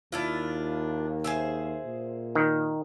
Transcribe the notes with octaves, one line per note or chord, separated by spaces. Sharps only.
D#2 D4 E4 F4
G#4 C5 E5
A#2
D#3